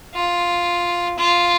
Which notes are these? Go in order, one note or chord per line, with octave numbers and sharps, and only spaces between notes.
F4
F4